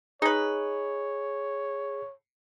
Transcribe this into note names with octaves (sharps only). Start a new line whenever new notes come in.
D#4 G#4 B4 C#5